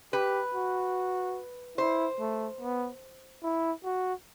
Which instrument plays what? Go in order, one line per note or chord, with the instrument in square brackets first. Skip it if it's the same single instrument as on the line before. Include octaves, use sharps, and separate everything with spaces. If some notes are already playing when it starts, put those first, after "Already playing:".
[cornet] G4 [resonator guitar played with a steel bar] B4
[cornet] F#4
[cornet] E4 [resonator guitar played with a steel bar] C5
[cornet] A3
B3
E4
F#4